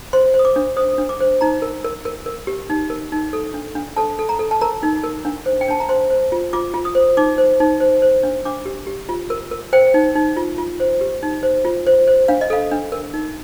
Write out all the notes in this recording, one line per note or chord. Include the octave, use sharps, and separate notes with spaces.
C5 C6
C5
D#6
D6
D4
C5 D#6
D4
D6
C5
D#4 A#5
A#4
A#4
A#4
A#4
G4
D#4
A#4
D#4
A4
D4
D4
A4 A5
A4
A#5
A4
A5
A#4 A#5
D#4
A#4
D4
C5
G5
D4 A5
A#5
C5 C6
C5
F4
F4 D6
F4
D#6
C5
D#4 D6
C5
D#4
C5
C5
D4
D4 D6
G4
G4
F4
A#4
A#4
C5 G5
D#4
D#4
F4
F4
C5
G4
D#4
C5
F4
C5
C5
D4 F5
D#5
A4 F5
D4
A#4
D#4